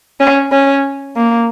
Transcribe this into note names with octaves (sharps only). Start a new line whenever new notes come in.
C#4
C#4
A#3